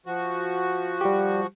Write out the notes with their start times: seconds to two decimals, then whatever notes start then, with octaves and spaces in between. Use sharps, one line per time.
0.06 F3 F#4
1.01 G3 G4